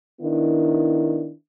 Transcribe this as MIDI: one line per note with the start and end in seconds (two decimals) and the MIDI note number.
0.21 1.30 51
0.21 1.30 59
0.21 1.30 62
0.21 1.30 64